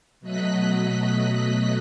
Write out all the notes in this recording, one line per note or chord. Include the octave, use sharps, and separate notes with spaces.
B2 F#3 A3 D#5 F#6 B6